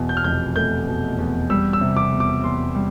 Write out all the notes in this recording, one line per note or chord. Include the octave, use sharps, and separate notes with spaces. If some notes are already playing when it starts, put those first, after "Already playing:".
Already playing: E2 B2
G6
F6
F1 G6
A3 G6
B2
E2
G3 E6
E6
C3
D6
E2
D6
E2 C6
G3